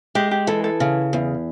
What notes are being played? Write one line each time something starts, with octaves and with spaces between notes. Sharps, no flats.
G#3 G4
G4
E3 A4
A4
C#3
E2